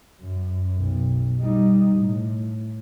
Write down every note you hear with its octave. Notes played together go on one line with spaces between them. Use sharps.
F#2
B1
G3 D#4
A2